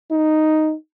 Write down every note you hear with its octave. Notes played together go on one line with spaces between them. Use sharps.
D#4